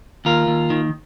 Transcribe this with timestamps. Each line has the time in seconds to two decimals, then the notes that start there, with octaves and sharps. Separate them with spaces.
0.25 D#2 F4 A#4
0.47 D#2
0.70 D#3